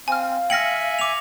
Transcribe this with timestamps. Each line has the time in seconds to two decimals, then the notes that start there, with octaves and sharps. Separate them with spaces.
0.08 C4 F5 G#5 F6
0.50 E5 G5 G#5 F6 A#6 C#7 F#7
0.99 D6 F7